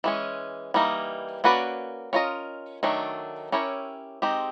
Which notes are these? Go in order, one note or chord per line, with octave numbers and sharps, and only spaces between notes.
E3 G#3 C#4
E3 G3 A#3 D#4
A#3 C#4 F#4 B4 D5
C#4 F4 A#4 D#5
D#3 F#3 A3 D4
C#4 E4 G4 A#4 C#5
G#3 C4 D#4 G4